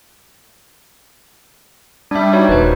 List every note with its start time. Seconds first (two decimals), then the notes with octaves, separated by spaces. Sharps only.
2.11 G3 D4 E5
2.33 D#4 F#4 C#5
2.49 D#1 B4 C5